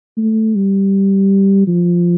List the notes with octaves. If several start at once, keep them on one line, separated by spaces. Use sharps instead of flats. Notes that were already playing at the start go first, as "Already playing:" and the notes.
A3
G3
F3